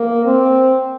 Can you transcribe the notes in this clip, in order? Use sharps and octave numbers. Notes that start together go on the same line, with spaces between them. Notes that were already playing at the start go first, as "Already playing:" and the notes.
Already playing: A#3
C4